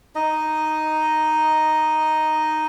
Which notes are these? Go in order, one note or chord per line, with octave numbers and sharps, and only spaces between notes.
D#4 D#5